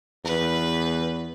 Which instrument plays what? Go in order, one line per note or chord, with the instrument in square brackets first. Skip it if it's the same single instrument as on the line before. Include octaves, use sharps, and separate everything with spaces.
[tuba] E2 [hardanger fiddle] B4